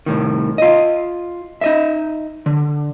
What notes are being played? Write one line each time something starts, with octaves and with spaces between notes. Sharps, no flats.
C2 A2 D#3
F4 D#5
D#4 D#5 E5
D3